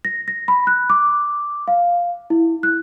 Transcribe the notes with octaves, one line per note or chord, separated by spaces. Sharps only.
A#6
A#6
B5
F#6
D6
F5
E4
F#6